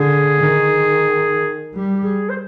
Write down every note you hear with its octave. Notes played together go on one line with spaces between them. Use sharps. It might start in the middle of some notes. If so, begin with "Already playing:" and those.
Already playing: D3 G#4
D#3
G3 G4
G4
G#4
C5